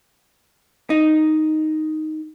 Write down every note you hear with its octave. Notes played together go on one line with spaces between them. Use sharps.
D#4